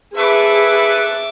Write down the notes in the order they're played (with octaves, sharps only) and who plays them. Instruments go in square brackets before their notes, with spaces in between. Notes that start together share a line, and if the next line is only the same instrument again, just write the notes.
[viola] G#4 [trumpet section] A4 B4 [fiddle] E5 D6